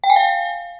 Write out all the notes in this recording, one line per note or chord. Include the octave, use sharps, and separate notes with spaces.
G5
G#5
F5